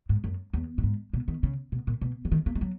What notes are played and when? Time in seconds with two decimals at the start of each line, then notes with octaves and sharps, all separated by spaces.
0.09 G#2
0.24 F#2
0.53 E2
0.78 A#2
0.83 G#2
1.13 B2
1.28 D#3
1.43 C#3
1.72 B2
1.87 A#2
2.01 B2
2.25 E3
2.32 D#3
2.46 A#3
2.55 G#3
2.61 F#3